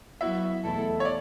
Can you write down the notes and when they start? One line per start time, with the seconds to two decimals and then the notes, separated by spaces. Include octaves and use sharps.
0.21 F#3 B3 E4 F#4 E5
0.63 E2 B2 A3 E4 A4
1.00 C#5
1.05 D5